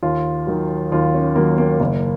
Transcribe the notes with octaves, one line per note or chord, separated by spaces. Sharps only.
D#2 F4
D#3 F#3
D#2 F4
C#4
D#3 F#3 A#3
A#3
F#1 A#3